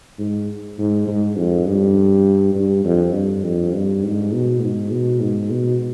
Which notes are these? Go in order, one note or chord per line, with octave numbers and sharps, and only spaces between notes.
G#2
G#2
G#2
F2
G2
G2
F2
G2
F2
G2
G#2
B2
G#2
B2
G#2
B2